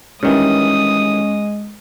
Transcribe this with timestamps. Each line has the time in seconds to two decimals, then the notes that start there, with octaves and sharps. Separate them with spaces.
0.23 G2 D#3 E3 G#3 C#4 D#6